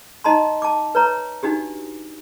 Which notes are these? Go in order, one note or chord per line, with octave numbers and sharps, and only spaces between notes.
D#4 D#5 A5 A#5 C6
A5 D6
B4 C#5 A#5
D4 D#4 F#4 G4